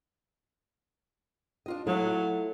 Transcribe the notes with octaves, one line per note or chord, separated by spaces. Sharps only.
D4 F4 D#5
F#3 A3 E4 F4